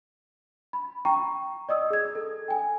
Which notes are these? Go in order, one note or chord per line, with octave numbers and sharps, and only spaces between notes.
B5
G5 A#5 C#6
D5 D#5 D#6 E6
G#4 G#6
A4
G5 G#5